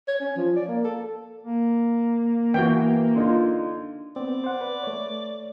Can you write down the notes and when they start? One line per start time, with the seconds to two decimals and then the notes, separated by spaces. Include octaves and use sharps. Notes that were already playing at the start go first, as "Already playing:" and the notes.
0.08 C#5
0.20 C#4
0.36 F3
0.56 D5
0.68 A#3
0.84 A4
1.43 A#3
2.54 E3 B3 F#4 G5
3.15 D3 D#4 F4
4.16 B3 C4 D5
4.44 C5 F#5
4.61 B4
4.83 A3 C#5